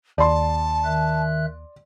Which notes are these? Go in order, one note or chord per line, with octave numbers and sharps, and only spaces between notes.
D#2 D5 A5 C6
D#3 E5 F#6